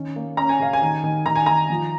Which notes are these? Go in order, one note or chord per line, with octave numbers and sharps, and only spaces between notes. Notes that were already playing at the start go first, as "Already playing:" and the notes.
Already playing: D#3 C#4
A#3
C#4 A#5
G#5
C#3 F5
G#5
D#3
D#3
D#3 A#5
G#5
D#3 A#5
F3